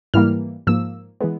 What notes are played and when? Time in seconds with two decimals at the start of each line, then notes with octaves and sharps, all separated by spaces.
0.14 G#2 E3 G3 A#3 F6
0.67 G#2 F3 A#3 E6
1.21 E3 G#3 B3